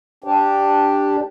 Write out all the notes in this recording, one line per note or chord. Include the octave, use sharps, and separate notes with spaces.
D4 G4